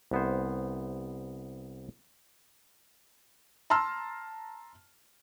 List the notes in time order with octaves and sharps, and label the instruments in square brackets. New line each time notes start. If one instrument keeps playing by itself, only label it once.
[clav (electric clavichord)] C2 B3 C5
[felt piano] A5 A#5 C6 E6 F6